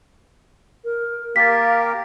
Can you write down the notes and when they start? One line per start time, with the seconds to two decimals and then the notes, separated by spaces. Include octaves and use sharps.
0.84 A#4
1.36 A#3 G4 A#4 F5 A6 B6